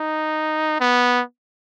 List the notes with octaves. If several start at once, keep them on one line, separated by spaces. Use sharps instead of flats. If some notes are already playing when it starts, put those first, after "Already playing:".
Already playing: D#4
B3